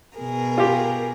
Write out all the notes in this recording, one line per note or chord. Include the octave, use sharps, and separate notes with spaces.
B2 G#4 A#4
F4 G4